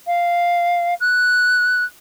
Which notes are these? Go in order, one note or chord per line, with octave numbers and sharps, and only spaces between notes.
F5
F#6